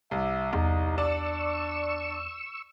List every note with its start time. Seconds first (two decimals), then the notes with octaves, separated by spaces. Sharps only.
0.11 C2 E5
0.53 E2 D#4
0.98 D4 D5 C#6 E6